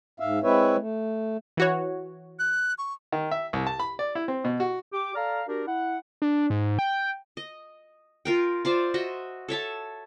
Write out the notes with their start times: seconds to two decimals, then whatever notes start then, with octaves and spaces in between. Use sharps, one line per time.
0.20 G#2 E5 F5
0.43 G#3 C4 E4 B4 C#5 E5
0.78 A3
1.57 E3 F#4 C#5
2.39 F#6
2.78 C#6
3.12 D#3
3.31 E5
3.53 C2
3.67 A5
3.79 B5
3.99 D5
4.15 E4
4.28 C4
4.44 B2
4.60 F#4
4.93 G4 D6
5.15 A4 D5 F5 A#5 F6
5.47 D4 F#4 G4 A#4
5.67 E4 F#5
6.22 D4
6.50 G#2
6.79 G5
7.37 D#5
8.25 F4 A#4 G5
8.65 F4 C5 D5 E5
8.94 F#4 D#5 E5
9.48 A4 C#5 E5 A5